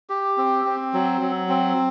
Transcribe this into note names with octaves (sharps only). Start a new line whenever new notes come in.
G4
C4
C4
F#3
F#3
C4